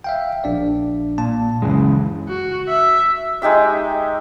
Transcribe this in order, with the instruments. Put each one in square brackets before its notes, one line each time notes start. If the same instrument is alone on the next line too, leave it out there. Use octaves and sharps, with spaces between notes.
[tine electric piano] E5 F5 G5
A#1 D4 D5
[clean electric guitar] A#2 [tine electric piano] A5
[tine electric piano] C#2 F#2 [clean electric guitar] C#3 E3 G#3
[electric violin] F#4
E5
[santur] G#3 D#4 G4 E5